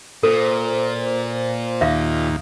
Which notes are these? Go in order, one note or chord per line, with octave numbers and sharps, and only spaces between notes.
A#2 A4 C5
D#2 E5 F5